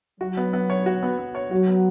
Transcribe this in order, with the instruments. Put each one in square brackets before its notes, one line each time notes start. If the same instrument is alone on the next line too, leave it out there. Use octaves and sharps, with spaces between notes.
[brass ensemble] F#3 [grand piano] F#4
[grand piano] B3
B3
C#5
F#4
B3
B3
C#5
[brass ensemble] F#3 [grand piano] F#4
[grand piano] B3